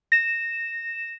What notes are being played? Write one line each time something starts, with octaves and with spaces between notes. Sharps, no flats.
A#6 E7